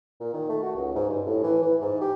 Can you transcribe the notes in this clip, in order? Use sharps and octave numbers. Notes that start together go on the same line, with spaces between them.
A#2
D#3
A3
F#4
C#2
G#2
G2
A2
E3
E3
G#2
G4